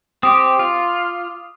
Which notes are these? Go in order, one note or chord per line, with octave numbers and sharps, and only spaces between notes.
C4 G4 D6 D#6
F4